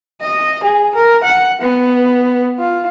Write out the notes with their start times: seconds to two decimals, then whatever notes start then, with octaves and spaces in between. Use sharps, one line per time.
0.22 D#5
0.64 G#4
0.95 A#4
1.24 F#5
1.62 B3
2.59 F4